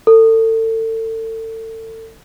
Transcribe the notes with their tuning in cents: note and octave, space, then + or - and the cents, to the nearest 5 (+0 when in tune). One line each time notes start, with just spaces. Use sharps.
A4 +30